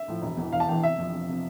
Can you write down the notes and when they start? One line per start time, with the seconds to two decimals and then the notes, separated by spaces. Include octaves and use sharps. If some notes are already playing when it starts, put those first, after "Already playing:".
Already playing: E5
0.08 A2 F3
0.22 E1
0.37 E2 E3
0.52 E1 F5
0.60 A5
0.69 E2 E3 G5
0.83 F1 E5
0.98 F2 C3 F3
1.13 F1
1.29 C3 F3